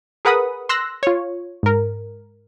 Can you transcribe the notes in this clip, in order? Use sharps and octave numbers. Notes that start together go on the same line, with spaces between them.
G#4 A#4 B4 F#5 B5 D#6
C6 E6 F#6 A#6
F4 C#5
G#2 A#4